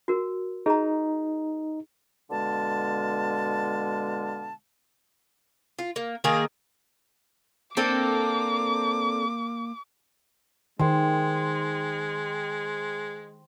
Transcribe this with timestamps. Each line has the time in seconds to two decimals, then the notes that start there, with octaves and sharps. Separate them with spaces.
0.08 F#4 A#4
0.66 D#4 G#4 A#5
2.30 B2 D3 G#3 F5 A5
5.79 F4
5.96 A#3
6.24 D#3 A#3 G#4
7.77 A#3 C4 D4 A4 D6
10.79 D#3 G#3 C5 G5